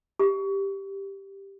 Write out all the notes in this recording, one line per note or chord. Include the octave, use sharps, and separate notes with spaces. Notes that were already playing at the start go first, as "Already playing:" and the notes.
G4